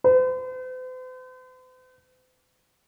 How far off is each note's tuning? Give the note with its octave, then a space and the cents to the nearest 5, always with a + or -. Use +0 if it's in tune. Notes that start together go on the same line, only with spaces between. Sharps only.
C5 -45